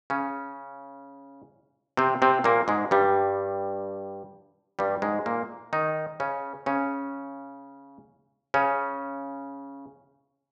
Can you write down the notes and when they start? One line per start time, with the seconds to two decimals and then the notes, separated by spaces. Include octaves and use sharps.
0.10 C#3 C#4
1.97 C3 C4
2.22 C3 C4
2.44 A#2 A#3
2.68 G#2 G#3
2.91 G2 G3
4.79 G2 G3
5.02 G#2 G#3
5.26 A#2 A#3
5.73 D#3 D#4
6.20 C#3 C#4
6.66 C#3 C#4
8.54 C#3 C#4